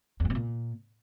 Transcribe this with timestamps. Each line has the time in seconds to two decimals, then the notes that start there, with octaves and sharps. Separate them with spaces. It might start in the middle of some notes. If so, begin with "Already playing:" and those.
0.20 E2
0.25 A2
0.30 B2
0.35 A#2